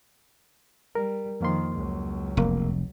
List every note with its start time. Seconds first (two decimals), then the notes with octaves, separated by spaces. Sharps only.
0.95 G3 A#4
1.41 F2 D#3 F3 A#3 C6
1.75 C#2 F#3
2.37 F1 F#2 A#3